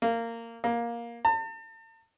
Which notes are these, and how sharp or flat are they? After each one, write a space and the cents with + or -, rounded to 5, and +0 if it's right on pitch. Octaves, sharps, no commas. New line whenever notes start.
A#3 -20
A#3 +10
A5 +40